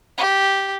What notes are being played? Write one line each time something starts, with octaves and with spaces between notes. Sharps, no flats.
G4